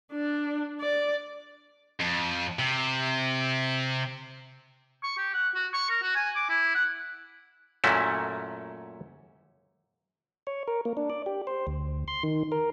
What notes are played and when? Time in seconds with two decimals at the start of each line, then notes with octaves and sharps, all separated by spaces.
0.12 D4
0.81 D5
2.00 F2
2.59 C3
5.03 C#6
5.17 G4
5.34 F#5
5.55 F#4
5.73 C#6
5.90 A#4
6.02 F#4
6.16 G#5
6.35 D6
6.49 E4
6.74 F#5
7.84 F#2 A#2 A3 C#4 E4 F#4
10.47 C#5
10.68 A#4
10.85 A#3
10.97 D4
11.10 D5
11.26 G4
11.47 C5
11.67 D2
12.08 C6
12.23 D#3
12.52 A#4